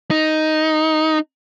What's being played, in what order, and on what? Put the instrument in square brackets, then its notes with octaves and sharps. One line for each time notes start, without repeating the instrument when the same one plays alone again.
[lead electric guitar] D#4